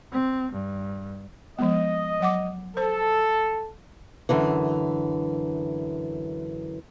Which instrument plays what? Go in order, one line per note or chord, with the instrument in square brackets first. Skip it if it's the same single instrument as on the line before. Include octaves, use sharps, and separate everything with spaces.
[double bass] C4
G2
[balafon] F3 G#3 B3 [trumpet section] D#5
[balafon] F#3 F#5 D6
[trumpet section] A4 [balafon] C5
[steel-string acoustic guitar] F#2 D3 E3